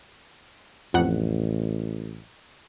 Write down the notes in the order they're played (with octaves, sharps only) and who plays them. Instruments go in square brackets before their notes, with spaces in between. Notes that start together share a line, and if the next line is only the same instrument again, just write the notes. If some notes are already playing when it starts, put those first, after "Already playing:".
[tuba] A1 [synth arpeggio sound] F2 F#5